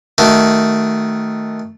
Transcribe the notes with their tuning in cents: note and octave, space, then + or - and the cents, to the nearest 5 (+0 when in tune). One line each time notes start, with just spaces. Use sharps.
D#3 +0 A3 +0 F#4 +25